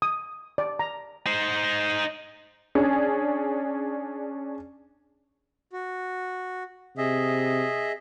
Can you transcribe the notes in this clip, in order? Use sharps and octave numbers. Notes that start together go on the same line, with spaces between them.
D#6
D5
A#5
D#4 C5
C#4 D4 G#4
F#4
C3 G#4 D#5 E5